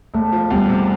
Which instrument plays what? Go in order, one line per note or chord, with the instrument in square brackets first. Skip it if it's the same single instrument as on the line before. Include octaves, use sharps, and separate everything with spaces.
[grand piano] E1 [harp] A3
[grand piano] F3
[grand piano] E2 [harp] G3
[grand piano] C3